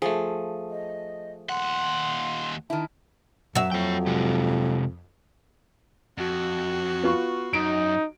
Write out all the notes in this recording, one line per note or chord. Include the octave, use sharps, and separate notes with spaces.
F3 A3 G#4
D#5
D#2 F#5 C6
D#3 E4 A5
F#2 F#3 E5
F2 C#5 G5
C3 G#3 G4
F2 F#4
B3 F4 C#6
F#2 D#4 D7